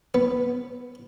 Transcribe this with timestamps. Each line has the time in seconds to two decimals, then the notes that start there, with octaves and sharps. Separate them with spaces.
0.14 B3